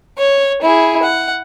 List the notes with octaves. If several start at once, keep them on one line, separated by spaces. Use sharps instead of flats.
C#5
E4 G#4
F#5